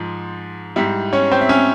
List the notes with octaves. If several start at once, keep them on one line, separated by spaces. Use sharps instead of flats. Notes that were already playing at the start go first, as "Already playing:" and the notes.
Already playing: G#2 F3
G#2 G3 E4 E5
C#4 C#5
C4 C5
E5
C#4 C#5